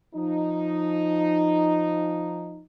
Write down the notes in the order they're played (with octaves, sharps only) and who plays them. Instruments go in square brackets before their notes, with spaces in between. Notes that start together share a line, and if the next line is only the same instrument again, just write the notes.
[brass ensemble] F3 D#4